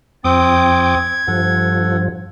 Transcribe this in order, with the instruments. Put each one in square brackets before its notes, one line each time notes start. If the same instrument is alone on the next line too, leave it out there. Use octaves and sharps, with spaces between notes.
[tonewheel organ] F2 G5 D6 [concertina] C4 D#6 [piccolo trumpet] G#6
[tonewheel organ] G2 F3 [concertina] A4 F#5